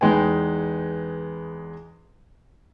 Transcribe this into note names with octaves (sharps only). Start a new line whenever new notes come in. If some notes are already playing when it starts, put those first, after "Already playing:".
E2 G#3 D#4 B4 G5 G#5